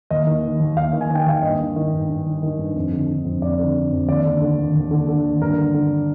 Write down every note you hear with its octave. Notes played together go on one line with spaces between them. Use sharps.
D#2 D#5
D#3
D#3
D#2
D#2 F5
D#3
G#5
D#3 G5
D#2 F5
G2 D#5
D#3
D#3
G2
G2
D#3
D#3
G2
F2
D3
D3
F2
F2 D5
D3
D3
F2
D#2 D5
D3
D3
D#2
D#2
D3
D3
D#2
G2 A#4
D3
D3